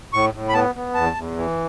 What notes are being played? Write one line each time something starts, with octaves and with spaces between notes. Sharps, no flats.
A2 C#6
A2
B5
B3 A5
B3
E2 A5
E2
E3